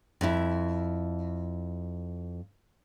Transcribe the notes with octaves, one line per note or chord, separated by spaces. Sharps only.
F2 E4